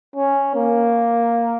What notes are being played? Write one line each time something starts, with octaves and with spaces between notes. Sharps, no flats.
C#4
A#3